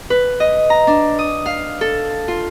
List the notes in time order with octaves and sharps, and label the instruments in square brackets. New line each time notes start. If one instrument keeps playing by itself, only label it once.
[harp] B4
D#5
A#5
D4
D#6
F5
A4
F4